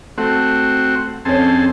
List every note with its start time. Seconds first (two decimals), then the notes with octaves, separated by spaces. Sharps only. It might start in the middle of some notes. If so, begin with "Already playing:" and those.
0.18 A3 C4 F#4
1.25 F2 C#4 G#4 A4 C5